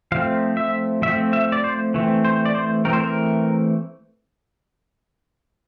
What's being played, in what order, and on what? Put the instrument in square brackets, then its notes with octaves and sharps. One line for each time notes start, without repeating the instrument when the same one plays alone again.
[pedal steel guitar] F3 A3 C4 F5
E5
F3 A3 C4 E5
E5
D5
C5
E3 A3 C4
C5
D5
C5
E3 A3 C4 A#4
C5
A#4